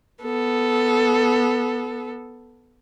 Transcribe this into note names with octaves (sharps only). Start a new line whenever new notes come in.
B3 A4